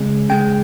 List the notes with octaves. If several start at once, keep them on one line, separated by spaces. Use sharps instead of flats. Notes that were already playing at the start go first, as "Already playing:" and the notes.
Already playing: C#3 G#3
C#3 G#3 G5